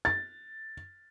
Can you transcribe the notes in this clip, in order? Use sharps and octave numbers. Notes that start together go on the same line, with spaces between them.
A6